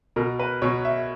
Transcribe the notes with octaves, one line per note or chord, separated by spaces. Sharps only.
B2 A#4
B4
B2 C#5
E5